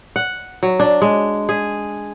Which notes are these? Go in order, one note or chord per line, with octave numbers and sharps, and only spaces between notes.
F#5
F#3
D4
G#3
G#4